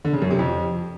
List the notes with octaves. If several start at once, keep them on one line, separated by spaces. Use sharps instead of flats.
D3
C#3
F#2
C3
F2